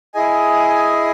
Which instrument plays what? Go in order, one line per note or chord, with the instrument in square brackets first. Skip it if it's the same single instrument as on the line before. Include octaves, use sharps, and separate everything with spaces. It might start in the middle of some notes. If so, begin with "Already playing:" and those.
[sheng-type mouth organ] E4 G#4 D#5 G#5